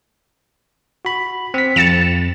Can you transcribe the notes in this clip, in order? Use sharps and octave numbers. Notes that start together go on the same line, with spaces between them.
F#4 B5
C4 B6
F2 A6 C#7 E7